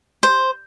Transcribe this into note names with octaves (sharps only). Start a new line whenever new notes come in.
C5